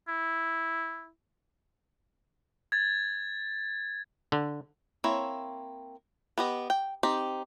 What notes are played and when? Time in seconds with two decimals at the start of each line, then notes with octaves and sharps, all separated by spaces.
0.08 E4
2.72 G#6 A6
4.32 D3
5.04 A#3 C4 E4 C#5
6.38 B3 G4 D#5
6.70 G5
7.03 C4 D#4 G4